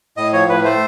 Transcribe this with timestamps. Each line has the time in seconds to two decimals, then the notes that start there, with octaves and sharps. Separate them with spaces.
0.17 A2 D#5
0.33 F3 C#5
0.49 A2 B4
0.64 A3 C5